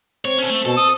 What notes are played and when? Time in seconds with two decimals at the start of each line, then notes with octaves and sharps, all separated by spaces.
0.25 C4 C#5
0.39 C#4 A4
0.50 A3
0.65 B2 A4
0.77 D#6